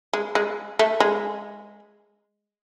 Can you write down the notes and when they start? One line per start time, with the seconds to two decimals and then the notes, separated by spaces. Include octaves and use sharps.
0.13 G#3
0.35 G#3
0.79 A3
1.00 G#3